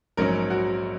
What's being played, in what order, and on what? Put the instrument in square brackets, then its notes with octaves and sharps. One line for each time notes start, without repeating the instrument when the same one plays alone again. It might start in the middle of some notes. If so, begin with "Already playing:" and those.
[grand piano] A#1 G#2 F#3 C#4 A#4
F#4